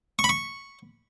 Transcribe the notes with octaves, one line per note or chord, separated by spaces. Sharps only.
C#6
B5
C#6